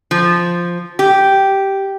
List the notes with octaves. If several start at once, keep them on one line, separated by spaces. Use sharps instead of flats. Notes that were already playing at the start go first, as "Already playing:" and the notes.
F3
G4